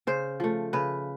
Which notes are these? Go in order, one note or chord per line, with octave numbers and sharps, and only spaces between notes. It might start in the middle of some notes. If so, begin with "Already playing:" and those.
C#3 C5
F3 A3
C#3 B4